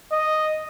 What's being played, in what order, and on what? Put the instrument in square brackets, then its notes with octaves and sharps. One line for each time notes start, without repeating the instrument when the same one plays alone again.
[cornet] D#5